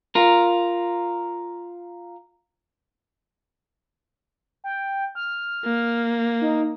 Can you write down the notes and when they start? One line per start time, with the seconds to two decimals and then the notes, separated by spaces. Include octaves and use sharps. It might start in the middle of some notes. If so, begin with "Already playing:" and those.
0.15 F4 A#4
4.64 G5
5.15 F6
5.65 A#3
6.41 D#4